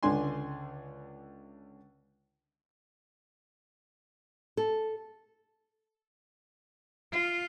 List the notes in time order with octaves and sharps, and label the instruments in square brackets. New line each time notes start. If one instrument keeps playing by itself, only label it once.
[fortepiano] C#2 D3 D4 G#5 C6
[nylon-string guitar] A4
[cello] F4